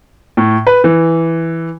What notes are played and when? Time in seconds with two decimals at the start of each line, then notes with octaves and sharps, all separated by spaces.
0.37 A2
0.67 B4
0.84 E3